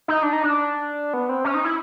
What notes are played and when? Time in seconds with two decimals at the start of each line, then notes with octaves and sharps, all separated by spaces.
0.08 D#4
0.23 D4
0.33 D#4
0.43 D4
1.14 B3
1.29 C4
1.44 C#4
1.54 D#4
1.64 E4